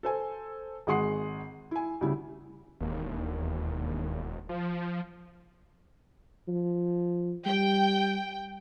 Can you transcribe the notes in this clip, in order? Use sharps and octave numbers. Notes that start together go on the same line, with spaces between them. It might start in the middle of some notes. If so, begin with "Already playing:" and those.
A4 C5 G#5
G#1 G#3 G#4 F#5 C6 C7
E4 G#5
D2 C#3 G3 E4
E1 D#2
F3
F3
G3 G5